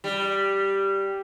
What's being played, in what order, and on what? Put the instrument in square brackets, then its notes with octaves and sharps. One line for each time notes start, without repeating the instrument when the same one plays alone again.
[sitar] G3